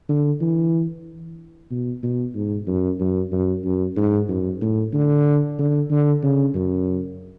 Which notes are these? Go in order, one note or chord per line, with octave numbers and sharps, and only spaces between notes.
D3
E3
B2
B2
G#2
F#2
F#2
F#2
F#2
G#2
F#2
A2
D3
D3
D3
C#3
F#2